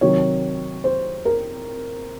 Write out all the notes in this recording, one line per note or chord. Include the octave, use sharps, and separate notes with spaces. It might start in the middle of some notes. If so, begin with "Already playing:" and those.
C3 D#3 F#3 C#5
C5
A#4